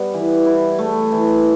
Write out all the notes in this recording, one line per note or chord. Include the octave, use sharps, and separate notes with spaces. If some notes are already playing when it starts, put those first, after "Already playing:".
Already playing: G3 B3
E3
E4
A3
E3